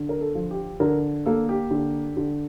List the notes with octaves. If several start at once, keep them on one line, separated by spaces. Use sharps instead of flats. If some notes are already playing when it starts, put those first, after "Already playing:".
Already playing: D3
A#4
A4
F3
G4
D3 A#4
A#3 A4
G4
D3
D3